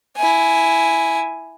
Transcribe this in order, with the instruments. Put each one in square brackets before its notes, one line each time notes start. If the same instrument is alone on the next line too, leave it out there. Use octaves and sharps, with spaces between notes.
[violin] E4 G#5